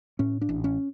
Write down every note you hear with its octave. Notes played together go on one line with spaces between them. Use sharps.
A2 C#4
D4
A1
C#4